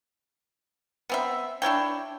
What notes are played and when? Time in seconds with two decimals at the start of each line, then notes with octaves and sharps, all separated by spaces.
1.09 B3 C4 E5
1.62 D4 E4 C#5 G5